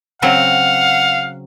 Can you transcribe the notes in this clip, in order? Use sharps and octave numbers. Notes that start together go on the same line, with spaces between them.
C#3 F#3 C4 F5 F#5